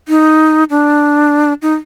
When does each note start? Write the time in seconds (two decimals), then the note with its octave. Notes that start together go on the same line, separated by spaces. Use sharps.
0.08 D#4
0.70 D4
1.62 D#4